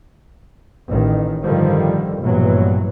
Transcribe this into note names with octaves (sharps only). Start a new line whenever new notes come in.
A1 D#3
G2 D3 D#3 F3 G3
A#1 G2 B2 E3 F#3